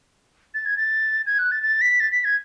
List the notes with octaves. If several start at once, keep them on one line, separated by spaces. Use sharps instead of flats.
A6
G#6
A6
G#6
F#6
A6
A6
B6
A6
B6
G#6